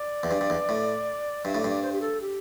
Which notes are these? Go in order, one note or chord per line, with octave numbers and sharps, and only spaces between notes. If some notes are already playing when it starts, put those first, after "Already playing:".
Already playing: D5
E2
G2
G2
E2
A2
G2 E5
A2 D5
G2
D5
C5
G4
A4
G4